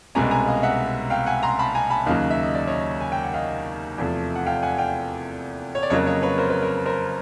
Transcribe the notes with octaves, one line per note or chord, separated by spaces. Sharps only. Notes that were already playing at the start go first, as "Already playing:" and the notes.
C2 B2 G#3 C#4 G#5 A#5
G#5 A#5
D#5 F5
E5 F#5
F5 G5
F#5 G#5
A#5 C6
A5 B5
G#5 A#5
A5 B5
D#2 C#3 F#3 D#5 F5
E5
D#5
D5
C#5 D#5
G#5
G5
F#5
D#5 F5
E2 C3 F3 A3
F#5
F5 G5
F#5 G#5
F5 G5
C#5
D5
F2 C#3 F#3 A#3 C#5 D#5
C#5 D#5
B4 C#5
A#4 C5
B4
A#4
A#4 C5